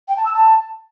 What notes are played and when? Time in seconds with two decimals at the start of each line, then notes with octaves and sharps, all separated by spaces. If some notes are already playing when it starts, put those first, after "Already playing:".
0.08 G5
0.16 A5
0.25 E6
0.33 A5